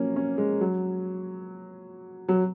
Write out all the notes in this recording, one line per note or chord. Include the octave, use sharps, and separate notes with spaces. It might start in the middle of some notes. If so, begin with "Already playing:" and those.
Already playing: F3 F#3 A#3 C#4
C#4
G#3
F#3
F#3